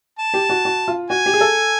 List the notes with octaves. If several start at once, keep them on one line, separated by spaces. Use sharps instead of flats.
A5
G4
F#4
F#4
F4
F#4 G#5
G4
G#4
A4